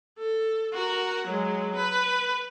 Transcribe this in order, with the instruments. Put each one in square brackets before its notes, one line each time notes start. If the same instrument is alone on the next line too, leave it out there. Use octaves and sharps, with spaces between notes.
[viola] A4
F#4 A#4
F#3 G#3
B4